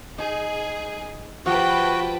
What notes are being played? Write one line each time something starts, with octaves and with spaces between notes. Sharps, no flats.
D#4 G#4
F3 F#4 G4 B4 G5 A5